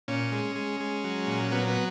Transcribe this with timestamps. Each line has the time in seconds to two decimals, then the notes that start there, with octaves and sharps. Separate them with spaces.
0.08 A#2 C#4
0.32 G#3
0.55 G#3
0.80 G#3
1.04 F#3
1.27 A#2
1.51 F#3 B3
1.68 B3